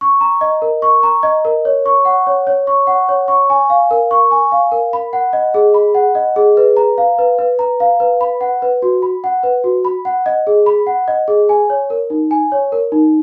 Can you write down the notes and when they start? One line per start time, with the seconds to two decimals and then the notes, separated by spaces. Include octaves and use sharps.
0.01 C#6
0.21 A#5
0.41 D#5
0.62 A#4
0.82 C#6
1.03 A#5
1.23 D#5
1.45 A#4
1.65 C#5
1.86 C#6
2.05 F#5
2.27 C#5
2.47 C#5
2.67 C#6
2.87 F#5
3.09 C#5
3.28 C#6
3.50 G#5
3.70 F5
3.91 A#4
4.11 C#6
4.31 G#5
4.52 F5
4.72 A#4
4.93 B5
5.13 F#5
5.33 D#5
5.54 G#4
5.74 B5
5.95 F#5
6.15 D#5
6.36 G#4
6.57 B4
6.77 A#5
6.98 F5
7.19 B4
7.38 B4
7.59 A#5
7.80 F5
8.00 B4
8.21 B5
8.41 F#5
8.62 B4
8.82 F#4
9.02 B5
9.24 F#5
9.43 B4
9.64 F#4
9.85 B5
10.05 F#5
10.26 D#5
10.47 G#4
10.66 B5
10.87 F#5
11.08 D#5
11.28 G#4
11.49 G#5
11.70 C#5
11.90 A#4
12.10 D#4
12.31 G#5
12.52 C#5
12.72 A#4
12.92 D#4